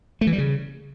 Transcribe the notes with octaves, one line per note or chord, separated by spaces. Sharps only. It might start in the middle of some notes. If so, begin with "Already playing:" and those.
A3
E3
G3
C#3